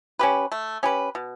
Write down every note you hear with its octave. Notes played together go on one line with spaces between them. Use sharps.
C#4 G4 B4
A3
C#4 G4 B4
B2